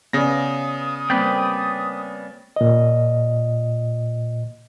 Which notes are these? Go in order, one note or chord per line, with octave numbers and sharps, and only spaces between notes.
C#3 B3 D5 D#6 A#6
G3 A#3 C4 B4 D5 G5
A#2 D#5